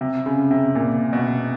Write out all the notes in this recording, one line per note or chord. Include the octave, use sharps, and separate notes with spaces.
C3
C#3
C3
A#2
B2